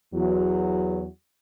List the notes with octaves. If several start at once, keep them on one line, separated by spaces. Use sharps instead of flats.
E2 F#3